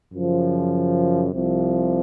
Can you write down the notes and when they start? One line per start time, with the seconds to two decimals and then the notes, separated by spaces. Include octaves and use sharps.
0.13 F#2 C#3 F3
1.30 C2 C3 F3